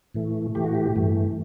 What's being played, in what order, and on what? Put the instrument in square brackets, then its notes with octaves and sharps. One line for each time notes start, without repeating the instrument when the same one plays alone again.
[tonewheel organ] A2 E3 A3
A2 E3 A3 G4
F#4
G4
G2 E3 A3